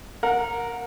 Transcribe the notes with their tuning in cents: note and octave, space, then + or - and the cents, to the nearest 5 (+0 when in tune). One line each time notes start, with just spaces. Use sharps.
A#4 +0 F#5 -30